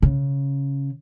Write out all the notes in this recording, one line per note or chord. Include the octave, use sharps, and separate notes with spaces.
C#3